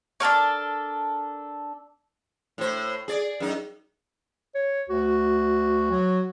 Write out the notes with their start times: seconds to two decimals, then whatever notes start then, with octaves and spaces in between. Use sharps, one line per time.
0.20 D4 A4 A#4 C#5
2.58 A2 C5
3.08 G#4 D5
3.40 F#2 D#4
4.55 C#5
4.90 D2 F#4
5.91 F#3